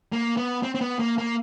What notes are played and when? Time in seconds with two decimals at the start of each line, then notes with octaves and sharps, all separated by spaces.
0.12 A#3
0.37 B3
0.63 C4
0.75 C4
0.81 B3
0.99 A#3
1.18 A#3